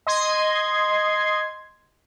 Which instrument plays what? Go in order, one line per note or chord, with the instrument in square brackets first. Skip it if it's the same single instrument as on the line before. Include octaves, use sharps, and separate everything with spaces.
[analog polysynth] D#5 C6 G#6